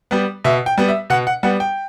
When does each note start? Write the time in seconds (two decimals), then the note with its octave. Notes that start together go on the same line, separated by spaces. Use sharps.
0.11 G3 B3
0.44 B2 E5
0.66 G5
0.78 G3 B3
0.89 E5
1.10 B2 F#5
1.27 F#5
1.43 G3 B3 F#5
1.60 G5